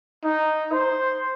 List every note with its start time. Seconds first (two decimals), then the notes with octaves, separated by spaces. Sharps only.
0.24 D#4
0.73 C5